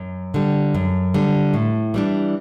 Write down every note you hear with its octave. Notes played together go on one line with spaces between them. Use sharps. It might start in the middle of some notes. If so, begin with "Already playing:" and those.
Already playing: F#2
D3 G3
F#2
D3 G3
A2
E3 G3 D4